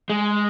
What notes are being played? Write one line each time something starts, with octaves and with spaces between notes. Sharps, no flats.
G#3